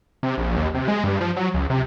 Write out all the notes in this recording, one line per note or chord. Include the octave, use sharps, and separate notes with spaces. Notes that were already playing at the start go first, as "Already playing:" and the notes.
C3
A#1
D#2
C3
G#3
G2
F3
F#3
C#2
C3